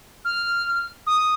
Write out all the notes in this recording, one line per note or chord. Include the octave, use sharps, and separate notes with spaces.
F6
D#6